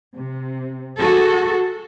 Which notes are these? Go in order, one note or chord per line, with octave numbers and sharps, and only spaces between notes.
C3
F#4 G#4 A4